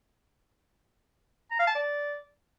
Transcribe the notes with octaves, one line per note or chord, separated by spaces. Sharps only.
A#5
F5
A5
D5